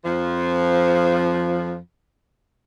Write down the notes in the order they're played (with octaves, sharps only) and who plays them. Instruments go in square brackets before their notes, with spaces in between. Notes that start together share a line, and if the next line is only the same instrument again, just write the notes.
[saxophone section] F2 F3